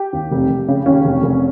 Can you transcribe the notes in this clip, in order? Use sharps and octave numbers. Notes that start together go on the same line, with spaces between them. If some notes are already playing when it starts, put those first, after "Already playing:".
Already playing: G4
D#2
F1
F1
C#3
D#2 C#4
F1
F1